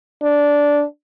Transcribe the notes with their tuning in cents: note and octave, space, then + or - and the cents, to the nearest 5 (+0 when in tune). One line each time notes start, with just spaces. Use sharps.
D4 -10